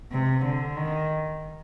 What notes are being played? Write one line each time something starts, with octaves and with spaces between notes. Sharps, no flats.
C3
D3
D#3